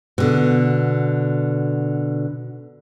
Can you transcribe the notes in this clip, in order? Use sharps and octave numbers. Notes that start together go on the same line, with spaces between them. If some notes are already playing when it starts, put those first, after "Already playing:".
B2 D3